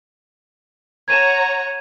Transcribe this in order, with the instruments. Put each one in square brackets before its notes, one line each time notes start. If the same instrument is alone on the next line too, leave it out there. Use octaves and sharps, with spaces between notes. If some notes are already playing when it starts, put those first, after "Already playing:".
[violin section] C#5 F#5 A#5 [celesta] G#6 D#7 E7